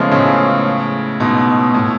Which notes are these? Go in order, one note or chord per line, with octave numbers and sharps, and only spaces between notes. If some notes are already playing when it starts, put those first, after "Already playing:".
Already playing: C#3 F3 G#3 A3 B3 C#4
A2 C#3
G#2 B2
A2